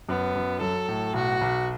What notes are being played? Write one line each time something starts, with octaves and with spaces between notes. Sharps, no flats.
F#2 B3
F#2
F#3 A4
A2
B1 F#4
B1